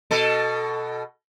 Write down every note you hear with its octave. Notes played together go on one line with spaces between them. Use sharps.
B2 A4